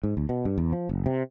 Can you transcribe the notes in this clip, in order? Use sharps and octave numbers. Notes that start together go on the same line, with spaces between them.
G#2
D2
B2
G2
E2
F3
F#1
C3